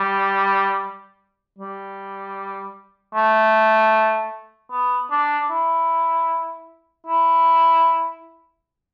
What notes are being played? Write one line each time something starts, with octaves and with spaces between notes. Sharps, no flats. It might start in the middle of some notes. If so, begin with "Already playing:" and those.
Already playing: G3
G3
A3
B3
D4
E4
E4